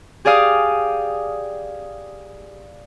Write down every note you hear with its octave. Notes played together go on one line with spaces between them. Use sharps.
G4 G#4 D5 F5 D#6